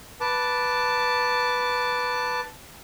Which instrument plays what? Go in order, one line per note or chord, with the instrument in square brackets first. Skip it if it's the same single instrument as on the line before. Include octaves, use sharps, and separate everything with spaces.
[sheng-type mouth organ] B4 A5 D6